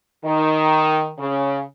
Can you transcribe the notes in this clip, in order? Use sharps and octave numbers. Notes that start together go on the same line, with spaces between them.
D#3
C#3